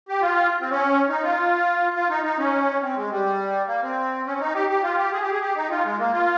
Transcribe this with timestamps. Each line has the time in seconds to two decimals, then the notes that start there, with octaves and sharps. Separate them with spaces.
0.09 G4
0.22 F4
0.61 C4
0.71 C#4
1.09 D#4
1.23 F4
1.95 F4
2.10 D#4
2.24 D#4
2.38 C#4
2.82 C4
2.96 G#3
3.10 G3
3.68 A#3
3.82 C4
4.26 C#4
4.40 D#4
4.54 G4
4.69 G4
4.83 F4
4.98 G4
5.12 G#4
5.22 G4
5.31 G#4
5.42 G4
5.56 D#4
5.70 F4
5.84 G#3
5.99 A#3
6.13 F4